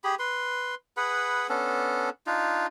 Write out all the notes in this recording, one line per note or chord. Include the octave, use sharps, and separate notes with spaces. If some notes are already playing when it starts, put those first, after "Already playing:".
G4 G#4 B5
B4 C6
G#4 B4 F#5 B5
B3 C#4 D4 A4
D4 D#4 F4